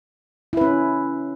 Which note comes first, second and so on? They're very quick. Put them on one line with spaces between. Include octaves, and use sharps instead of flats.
E4 B4 C#4